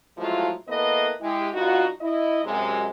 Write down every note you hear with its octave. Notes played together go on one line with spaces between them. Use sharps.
F3 F#3 G#3 A3 E4 F4
E3 A#3 B3 A4 B4 D#5
G#3 E4 G4
G2 D#4 F4 F#4
E4 D#5
F#2 C3 G#3